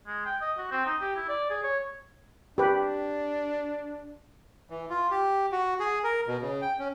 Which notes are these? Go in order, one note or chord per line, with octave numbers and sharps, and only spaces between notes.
G#3
G5
D#5
F#4
C4
D#4
G4
E4
D5
G#4
C#5
D4 G4 B4
E3
F4
G4
F#4
G#4
A#4
B2
C#3
G5
C#4